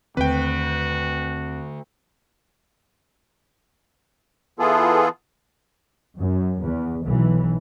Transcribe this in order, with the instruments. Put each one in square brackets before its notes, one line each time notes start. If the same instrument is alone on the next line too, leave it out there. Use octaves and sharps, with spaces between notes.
[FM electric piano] D#2 C4 [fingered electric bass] D3 A3 [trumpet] F#4 [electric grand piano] B4 G5
[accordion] E3 B3 F4 G#4 A4
[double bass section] F#2
E2
B1 E3